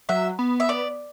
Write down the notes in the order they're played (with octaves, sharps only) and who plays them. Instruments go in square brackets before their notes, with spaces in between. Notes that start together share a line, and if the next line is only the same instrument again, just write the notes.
[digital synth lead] F#3 [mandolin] E5
[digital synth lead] B3
[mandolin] E5
D5